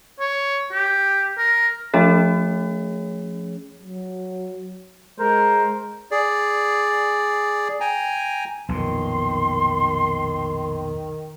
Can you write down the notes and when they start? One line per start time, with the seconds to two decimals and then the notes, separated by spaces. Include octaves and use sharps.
0.20 C#5
0.72 G4
1.38 A#4
1.94 F3 A3 C#4 G#4 C#5
3.83 F#3
5.20 G#3 A#4 C5
6.11 G#4 D5
7.80 G5 G#5 A#5
8.69 B1 F2 A#2 D#3 C6